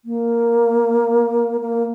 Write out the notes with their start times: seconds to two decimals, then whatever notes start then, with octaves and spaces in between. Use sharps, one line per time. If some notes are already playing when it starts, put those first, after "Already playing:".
0.05 A#3
1.61 A#3